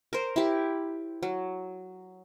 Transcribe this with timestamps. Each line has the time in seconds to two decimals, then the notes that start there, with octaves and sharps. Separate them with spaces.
0.13 A#4 C5
0.36 E4 G4
1.23 F#3